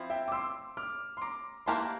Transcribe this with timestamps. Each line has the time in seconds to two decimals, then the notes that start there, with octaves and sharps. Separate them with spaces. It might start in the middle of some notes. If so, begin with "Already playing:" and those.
Already playing: F3 C4 E4
0.10 E5 G5
0.28 D6
0.32 C6 E6
0.77 D6 F6
1.17 C6
1.22 A#5 D6
1.66 E3 A#3 E4 G4 A#4 A5 C6